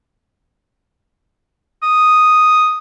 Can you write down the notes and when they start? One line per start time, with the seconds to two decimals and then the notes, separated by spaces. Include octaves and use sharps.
1.83 D#6